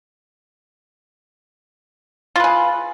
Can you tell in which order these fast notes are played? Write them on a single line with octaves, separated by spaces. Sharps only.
F4 B4 G#4